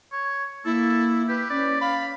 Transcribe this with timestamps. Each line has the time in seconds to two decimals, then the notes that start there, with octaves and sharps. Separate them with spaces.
0.12 C#5
0.65 A#3 E4 A4
1.28 G4 B4
1.50 C#4 D5
1.81 F5 B5